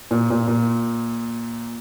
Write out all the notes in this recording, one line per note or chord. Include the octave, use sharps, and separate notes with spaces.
A#2
A#2
A#2